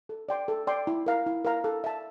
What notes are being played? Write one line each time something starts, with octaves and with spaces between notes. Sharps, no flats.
A4
D5 G5 C6
A4
D5 G5 C6
E4
A#4 F5 A#5
E4
A#4 F5 A#5
A4
E5 A5